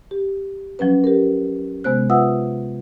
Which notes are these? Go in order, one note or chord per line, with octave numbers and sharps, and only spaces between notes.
G4
F3 F#3 C#4 B4
G4 A#4
C3 G#3 B3 C5 F#6
F4 B4 E5 F#5 D#6 E6